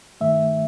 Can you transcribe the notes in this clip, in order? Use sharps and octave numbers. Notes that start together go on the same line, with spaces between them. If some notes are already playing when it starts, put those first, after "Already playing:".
G2 D#3 A3 E5